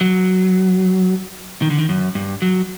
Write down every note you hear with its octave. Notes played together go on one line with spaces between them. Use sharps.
F#3
D#3
D3
D#3
F#2
G2
F#3